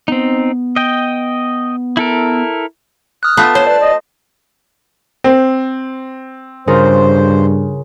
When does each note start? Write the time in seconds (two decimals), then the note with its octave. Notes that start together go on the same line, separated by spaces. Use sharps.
0.08 B3 C4 D#4
0.76 D#5 G5
1.97 E4 A4 A#4
3.23 D#6 F6 F#6
3.37 A3 B3 F4 A5
3.55 C5 C#5
3.67 B4 D5
3.80 D#5
5.24 C4
6.67 G2 C#3 F4 A#4 C5